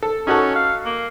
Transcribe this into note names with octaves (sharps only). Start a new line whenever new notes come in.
A4
C#4 D#4 F#4 A4
F5
A#3